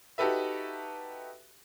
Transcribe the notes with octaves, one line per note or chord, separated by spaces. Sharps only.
D#4 F#4 G4 A4 B4 E5